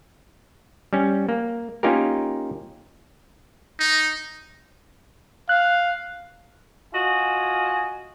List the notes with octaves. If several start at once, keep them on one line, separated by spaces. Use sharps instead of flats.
G3 C#4
A#3
A#3 C#4 D#4 F4 G4 A#4
D#4
F5 F#6
F4 F#4 D#5 G#5